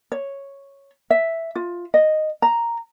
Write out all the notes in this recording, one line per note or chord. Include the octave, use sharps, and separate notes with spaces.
C#5
E5
F4
D#5
A#5